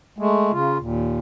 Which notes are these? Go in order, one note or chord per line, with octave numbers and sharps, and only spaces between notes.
G#3 A3
C#3 F4
D#2 A#2